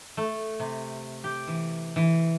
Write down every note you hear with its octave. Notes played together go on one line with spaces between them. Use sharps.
A3
C3
G4
E3
E3